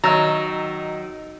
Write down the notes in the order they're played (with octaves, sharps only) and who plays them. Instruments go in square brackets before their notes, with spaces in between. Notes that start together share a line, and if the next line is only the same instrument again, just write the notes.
[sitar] D#3 [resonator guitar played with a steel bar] F#3 [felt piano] D#5 E6 A6 [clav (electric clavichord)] A#5